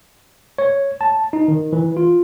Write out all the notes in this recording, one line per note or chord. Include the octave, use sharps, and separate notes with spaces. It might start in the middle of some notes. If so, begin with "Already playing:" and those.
C#5
A5
D#4
D#3
E3
F4